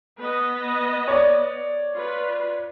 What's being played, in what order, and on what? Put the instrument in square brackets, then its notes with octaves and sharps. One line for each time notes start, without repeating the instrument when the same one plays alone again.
[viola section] B3 B4 D#5
[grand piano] C#5 D5
[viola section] F4 B4